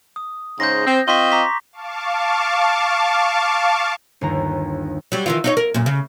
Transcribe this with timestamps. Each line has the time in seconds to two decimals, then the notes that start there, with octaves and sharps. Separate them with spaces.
0.16 D#6
0.60 G#2 C#3 C5 G6 A#6
0.87 C4
1.08 C4 F4 D#5 C6 C#6 B6
1.32 A#5 D6 B6
1.73 F5 A5 C#6 D6
4.21 G1 D#2 A#5
5.12 F#3 G3
5.26 D#3 E3 F4
5.44 D#4 F4 C#5
5.57 A#4
5.74 F#2 A#2
5.86 C#3